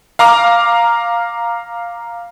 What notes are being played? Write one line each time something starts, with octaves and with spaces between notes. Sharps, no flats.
F5 A#5 D6 F6